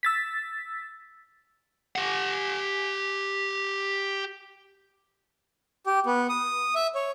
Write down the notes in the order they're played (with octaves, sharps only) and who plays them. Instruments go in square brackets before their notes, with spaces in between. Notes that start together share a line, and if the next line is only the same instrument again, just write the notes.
[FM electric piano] E6 A6 B6
[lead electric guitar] G4 F#5
[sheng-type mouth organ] G4
B3
D#6
E5
C#5